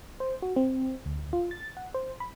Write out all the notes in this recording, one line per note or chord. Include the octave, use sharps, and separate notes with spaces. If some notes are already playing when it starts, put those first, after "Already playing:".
C5
F#4
C4
D2
F4
A6
F#5
C5
B5